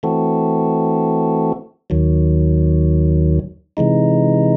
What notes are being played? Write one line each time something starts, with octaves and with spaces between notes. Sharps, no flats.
E3 A3 C4 F#4 A4
D#2 D#3 F#3
C3 E3 G#3 D#4